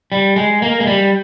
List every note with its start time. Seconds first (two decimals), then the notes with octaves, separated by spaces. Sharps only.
0.12 G3
0.36 G#3
0.62 A#3
0.80 G#3
0.87 G3